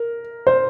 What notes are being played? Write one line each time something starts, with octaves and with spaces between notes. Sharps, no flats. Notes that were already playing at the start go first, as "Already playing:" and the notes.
Already playing: A#4
C5